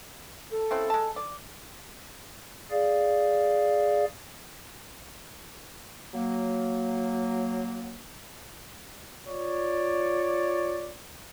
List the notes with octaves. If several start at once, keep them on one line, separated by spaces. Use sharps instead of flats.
A4
C#3 C4 E4
G#3 A5
D5
G#4 D5 F5
F#3 A#3
F4 C#5 D5